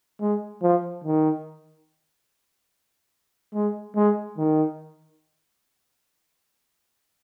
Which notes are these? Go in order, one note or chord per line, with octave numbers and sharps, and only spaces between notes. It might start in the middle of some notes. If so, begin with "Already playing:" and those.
G#3
F3
D#3
G#3
G#3
D#3